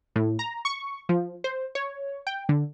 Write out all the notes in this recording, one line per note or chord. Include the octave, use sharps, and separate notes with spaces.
A2
A#5
C#6
F3
C5
C#5
G5
D3